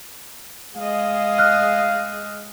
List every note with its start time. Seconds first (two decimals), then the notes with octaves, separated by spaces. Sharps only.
0.77 G#3 G#4 D#5 F5
1.38 F6 F#6